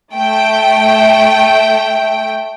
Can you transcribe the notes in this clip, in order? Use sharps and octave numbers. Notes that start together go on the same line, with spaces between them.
A3 G5